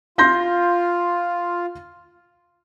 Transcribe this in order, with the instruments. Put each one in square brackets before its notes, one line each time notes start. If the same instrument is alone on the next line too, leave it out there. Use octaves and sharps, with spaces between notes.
[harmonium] F4 [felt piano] C6 G6 A#6